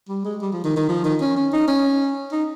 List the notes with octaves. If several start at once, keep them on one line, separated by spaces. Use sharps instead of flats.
G3
G#3
G3
F3
D#3
D#3
F3
D#3
C#4
C#4
D#4
C#4
D#4